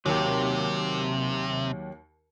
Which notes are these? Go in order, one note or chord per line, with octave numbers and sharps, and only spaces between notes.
D#2 C3 F#3 G4